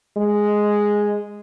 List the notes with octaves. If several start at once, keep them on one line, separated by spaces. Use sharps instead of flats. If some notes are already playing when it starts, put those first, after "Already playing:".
G#3